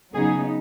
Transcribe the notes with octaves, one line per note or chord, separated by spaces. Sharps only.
C#3 F#3 B3 D#4 G#4